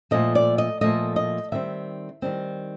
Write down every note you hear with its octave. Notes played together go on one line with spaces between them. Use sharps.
A#2 F3 A3 D#5
D5
D#5
A#2 F3 A3 D#5
D#5
D#3 G3 C4 E5
D#3 G3 C4